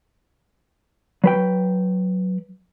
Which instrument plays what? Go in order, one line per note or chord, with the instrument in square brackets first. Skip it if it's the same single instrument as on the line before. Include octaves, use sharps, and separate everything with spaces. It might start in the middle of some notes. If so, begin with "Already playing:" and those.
[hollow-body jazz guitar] F#3 B4 G5